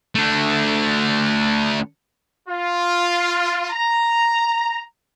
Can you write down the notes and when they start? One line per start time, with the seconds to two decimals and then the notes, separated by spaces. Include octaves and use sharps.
0.15 A3 D4
2.49 F4
3.71 A#5